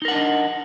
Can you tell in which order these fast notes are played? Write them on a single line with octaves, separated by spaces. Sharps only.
D#4 A#4 F#5 D4 D#5